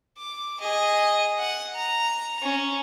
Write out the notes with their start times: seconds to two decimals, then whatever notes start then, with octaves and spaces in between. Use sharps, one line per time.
0.18 D6
0.60 G#4 D#5
1.39 F#5
1.75 A#5
2.43 C#4